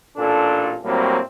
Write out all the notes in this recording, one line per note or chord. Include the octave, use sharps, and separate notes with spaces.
A1 A#2 D4 A4
A2 F#3 G3 A3 A#3 C4